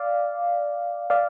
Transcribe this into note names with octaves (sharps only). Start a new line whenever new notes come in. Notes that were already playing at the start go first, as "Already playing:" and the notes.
Already playing: D5 F5
D5 F5